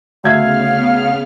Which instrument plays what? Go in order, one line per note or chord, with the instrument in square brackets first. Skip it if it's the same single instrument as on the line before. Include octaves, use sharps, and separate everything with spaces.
[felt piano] D2 E5 G#6 [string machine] C#3 B3 F6 [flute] F5